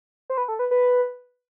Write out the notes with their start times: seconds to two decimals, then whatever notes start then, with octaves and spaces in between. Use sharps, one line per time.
0.30 C5
0.38 B4
0.48 A4
0.59 B4
0.71 B4